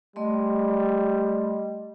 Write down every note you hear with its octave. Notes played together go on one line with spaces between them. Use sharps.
G3 A3 D#5 C6